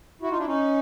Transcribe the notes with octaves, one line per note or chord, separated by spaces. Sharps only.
E4 F#4
D#4 F4
D4 E4
C#4 D#4